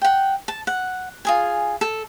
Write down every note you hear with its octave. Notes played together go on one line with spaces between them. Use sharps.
F#5 G5
A5
F#5
F4 G#4 G#5
A4